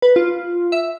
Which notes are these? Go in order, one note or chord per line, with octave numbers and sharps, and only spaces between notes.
B4
F4
E5